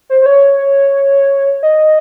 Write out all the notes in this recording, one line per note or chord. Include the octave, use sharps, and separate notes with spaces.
C5
C5
C#5
D#5